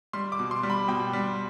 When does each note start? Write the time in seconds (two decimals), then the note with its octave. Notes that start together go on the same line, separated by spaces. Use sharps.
0.13 G3 C6
0.32 D6
0.39 B2
0.51 C6
0.63 G3
0.70 B5
0.88 B2 G5
1.13 G3